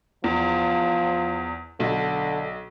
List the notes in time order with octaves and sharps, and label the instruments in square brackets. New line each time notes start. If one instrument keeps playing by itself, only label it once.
[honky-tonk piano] E2 [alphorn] F3
[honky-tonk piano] B1 [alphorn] D3